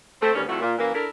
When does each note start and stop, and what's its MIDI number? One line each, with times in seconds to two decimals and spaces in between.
0.22 0.33 57
0.22 0.33 60
0.35 0.43 38
0.35 0.43 51
0.35 0.43 55
0.35 0.43 59
0.35 0.43 61
0.49 0.58 48
0.49 0.58 53
0.49 0.58 55
0.49 0.58 57
0.49 0.58 64
0.49 0.58 66
0.60 0.74 46
0.79 0.91 42
0.79 0.91 52
0.79 0.91 54
0.79 0.91 58
0.94 1.06 62
0.94 1.06 64
0.94 1.06 69
0.94 1.06 70